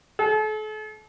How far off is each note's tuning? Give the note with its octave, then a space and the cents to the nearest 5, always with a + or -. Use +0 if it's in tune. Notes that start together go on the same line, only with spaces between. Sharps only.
A4 -40